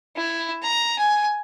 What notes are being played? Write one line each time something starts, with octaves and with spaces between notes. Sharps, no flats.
E4
A#5
G#5